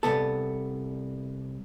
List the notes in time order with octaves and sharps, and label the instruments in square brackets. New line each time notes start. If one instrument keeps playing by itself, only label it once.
[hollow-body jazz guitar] C2 B3 A4